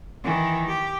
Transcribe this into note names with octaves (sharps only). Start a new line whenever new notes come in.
D#3 E3
G4